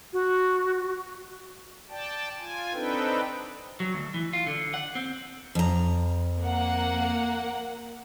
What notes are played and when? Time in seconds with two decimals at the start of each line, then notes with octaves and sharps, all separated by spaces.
0.13 F#4
1.89 D5 G5 A5
2.39 F4 G#5
2.73 C4 D4 D#4 A4 B4 G5
3.80 F#3
3.94 D2
4.14 E3
4.33 F4
4.47 D3
4.74 F#5
4.95 C4
5.55 F2 A#5
6.41 A#3 F#5